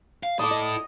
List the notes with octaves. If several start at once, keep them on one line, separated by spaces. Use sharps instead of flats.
F5
E4 A4 D6 D#6
D#5